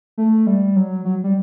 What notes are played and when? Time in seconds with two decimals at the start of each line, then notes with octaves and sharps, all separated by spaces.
0.18 A3
0.47 G3
0.76 F#3
1.05 F#3
1.24 G3